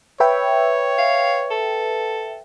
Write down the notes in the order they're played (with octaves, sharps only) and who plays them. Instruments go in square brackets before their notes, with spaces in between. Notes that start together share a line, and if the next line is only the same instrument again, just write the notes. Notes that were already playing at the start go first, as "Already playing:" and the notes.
[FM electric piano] B4 E5 G5 [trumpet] C#5
[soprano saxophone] F5
A4